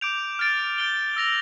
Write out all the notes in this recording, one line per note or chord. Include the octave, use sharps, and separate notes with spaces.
D6 G6 D7 F7
F6 A6 D7
G6 D7 G7
E6 A#6 F7